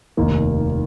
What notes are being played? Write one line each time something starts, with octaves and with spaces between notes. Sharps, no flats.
F1 D#2 D#3 A#3